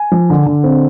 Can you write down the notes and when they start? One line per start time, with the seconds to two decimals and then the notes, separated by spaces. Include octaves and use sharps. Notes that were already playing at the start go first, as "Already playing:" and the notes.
Already playing: G#5
0.11 F3
0.30 D3
0.46 D3
0.64 C4